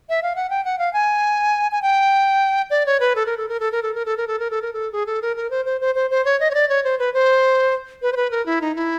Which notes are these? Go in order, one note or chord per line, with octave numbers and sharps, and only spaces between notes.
E5
F5
F#5
G5
F#5
F5
G#5
G#5
G5
D5
C#5
B4
A4
A#4
A4
A#4
A4
A#4
A4
A#4
A4
A#4
A4
A#4
A4
A#4
A4
G#4
A4
A#4
A#4
C5
C5
C5
C5
C5
C#5
D#5
C#5
D5
C#5
C5
B4
C5
B4
C5
B4
A#4
E4
D#4
E4